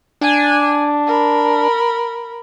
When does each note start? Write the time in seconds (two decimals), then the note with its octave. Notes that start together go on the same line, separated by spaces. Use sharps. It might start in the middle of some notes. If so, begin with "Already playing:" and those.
0.21 D4 G#5
1.07 A#4 B5